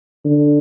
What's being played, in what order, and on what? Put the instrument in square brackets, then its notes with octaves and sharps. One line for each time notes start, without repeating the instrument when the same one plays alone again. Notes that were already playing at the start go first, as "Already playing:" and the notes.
[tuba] D3